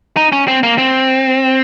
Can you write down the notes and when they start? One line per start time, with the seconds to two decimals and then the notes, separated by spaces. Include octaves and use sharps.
0.16 D#4
0.32 C#4
0.48 C4
0.63 A#3
0.78 C4